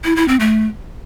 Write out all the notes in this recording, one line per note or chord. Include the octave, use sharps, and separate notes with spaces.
E4
E4
C4
A3